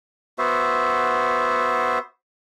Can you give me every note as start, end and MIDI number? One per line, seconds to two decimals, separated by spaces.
0.38 1.99 59
0.38 1.99 66
0.38 1.99 72
0.38 1.99 76